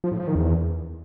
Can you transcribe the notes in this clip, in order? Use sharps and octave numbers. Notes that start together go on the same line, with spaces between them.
F3
A2
F3
D#3
E2